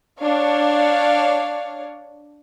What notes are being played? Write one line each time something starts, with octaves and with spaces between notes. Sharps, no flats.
D4 C#5 F5